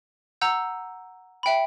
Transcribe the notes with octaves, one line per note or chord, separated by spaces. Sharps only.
F#5 A#5 E6 G6
E5 G5 B5